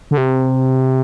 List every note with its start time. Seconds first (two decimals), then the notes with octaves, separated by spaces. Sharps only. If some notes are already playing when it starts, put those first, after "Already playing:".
0.11 D3
0.18 C3